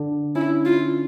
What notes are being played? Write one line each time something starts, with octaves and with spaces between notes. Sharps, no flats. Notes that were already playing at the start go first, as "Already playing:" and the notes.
Already playing: D3 D4
C#4 E4
F4